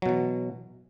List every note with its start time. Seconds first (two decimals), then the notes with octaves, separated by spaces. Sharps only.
0.02 F#3
0.06 B2
0.09 E3